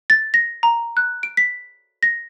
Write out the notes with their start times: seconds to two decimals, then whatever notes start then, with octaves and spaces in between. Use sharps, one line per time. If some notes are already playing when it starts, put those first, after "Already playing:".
0.10 A6
0.34 A#6
0.63 A#5
0.97 F#6
1.23 D7
1.37 B6
2.03 A#6